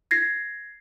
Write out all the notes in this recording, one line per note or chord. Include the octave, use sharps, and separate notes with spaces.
G#6 A#6 C7